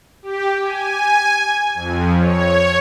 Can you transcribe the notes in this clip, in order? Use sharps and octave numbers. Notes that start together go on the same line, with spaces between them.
G4
G#5
F2
C#5